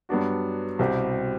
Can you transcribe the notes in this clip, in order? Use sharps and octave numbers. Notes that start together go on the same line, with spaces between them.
G2 F#3 B3 D4 F#4
C2 B2 G3 C4 G4